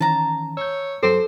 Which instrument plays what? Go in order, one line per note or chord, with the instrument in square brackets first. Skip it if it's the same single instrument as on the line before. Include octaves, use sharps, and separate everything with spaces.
[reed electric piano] D#3 E3 C#4 [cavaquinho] A5 A#5
[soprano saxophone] C#5 [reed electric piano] E6 G6
[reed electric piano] G2 F#3 [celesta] A4 [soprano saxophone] C5